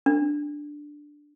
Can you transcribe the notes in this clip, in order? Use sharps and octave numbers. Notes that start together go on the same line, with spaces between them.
D4